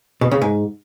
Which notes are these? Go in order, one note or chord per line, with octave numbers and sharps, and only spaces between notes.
B2
C#3
G#2